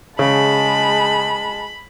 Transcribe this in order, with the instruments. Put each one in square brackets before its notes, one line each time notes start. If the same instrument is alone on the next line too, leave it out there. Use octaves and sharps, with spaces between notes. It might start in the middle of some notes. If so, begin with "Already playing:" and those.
[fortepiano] C#3 [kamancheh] G#3 A5 [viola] B5